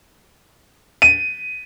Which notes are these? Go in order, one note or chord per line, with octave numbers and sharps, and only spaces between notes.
D#7